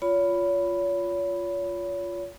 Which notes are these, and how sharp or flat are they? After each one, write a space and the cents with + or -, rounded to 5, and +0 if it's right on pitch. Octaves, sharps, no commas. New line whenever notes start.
F4 +0 C#5 +35 B5 +0